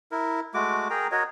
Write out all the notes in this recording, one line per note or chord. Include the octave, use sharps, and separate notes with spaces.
E4 A#4
G#3 A3 F#4 D6
G#4 A#4 G5 A#5
F#4 A#4 C#5 D#5